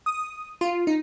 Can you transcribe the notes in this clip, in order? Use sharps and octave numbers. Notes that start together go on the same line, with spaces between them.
D#6
F4
D#4